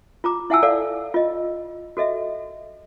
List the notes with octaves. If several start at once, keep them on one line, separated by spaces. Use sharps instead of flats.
F4 A#5 D6
E4 E5 F#5 G#5 A5 E6
A4 D5 F5 F#5 E6
F4 D#5
F#4 A4 D#5 E5